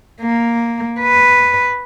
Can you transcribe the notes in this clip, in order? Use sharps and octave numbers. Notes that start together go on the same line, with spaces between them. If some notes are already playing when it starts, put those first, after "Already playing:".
A#3
B4